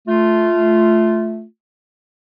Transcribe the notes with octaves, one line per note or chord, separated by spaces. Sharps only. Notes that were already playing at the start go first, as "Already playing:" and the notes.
A3 F4